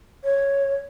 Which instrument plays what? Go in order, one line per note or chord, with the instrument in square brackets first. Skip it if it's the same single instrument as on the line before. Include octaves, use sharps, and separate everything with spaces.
[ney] C#5